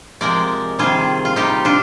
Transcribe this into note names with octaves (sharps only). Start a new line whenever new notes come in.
C3 F3 G#3 A#4 D5
C3 D#3 G3 F4 G#4
F4
C3 G3 D#4 G4
D4 F4